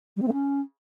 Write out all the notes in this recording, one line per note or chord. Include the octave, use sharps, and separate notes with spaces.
G3
C4
A3
C#4